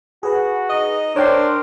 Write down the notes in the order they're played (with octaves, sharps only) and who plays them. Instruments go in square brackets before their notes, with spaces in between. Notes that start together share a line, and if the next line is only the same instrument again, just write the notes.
[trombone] F#4 [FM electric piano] G#4 B4
[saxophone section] D#4 D#5
[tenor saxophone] D4 [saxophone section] A#4 [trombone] C5 [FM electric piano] C#5 G5 C6